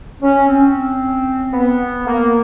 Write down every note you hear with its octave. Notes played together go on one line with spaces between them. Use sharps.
C#4
C4
B3
A#3